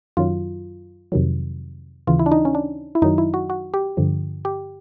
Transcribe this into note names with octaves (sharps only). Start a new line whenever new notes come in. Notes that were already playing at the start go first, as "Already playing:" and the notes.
F#2 D#3 F#3 F4
F2 C3 D#3 F#3
D#2 C#3 E3 F4
E4
D4
D#4
C#4
D4
E4
F#2 D#3 F#3 D#4
E4
F#4
F#4
G4
G2 D3 F3
G4